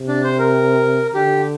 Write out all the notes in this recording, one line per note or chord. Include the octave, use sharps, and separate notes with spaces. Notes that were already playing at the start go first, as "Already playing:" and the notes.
Already playing: C3
D4
C5
A#4
D3 G4